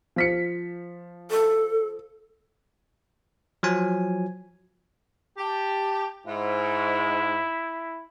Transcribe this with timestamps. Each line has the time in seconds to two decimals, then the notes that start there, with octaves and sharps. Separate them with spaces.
0.16 F3 B6 C#7
1.31 A4
3.63 F3 F#3 G#5
5.38 G4 A5
6.27 G#2 E4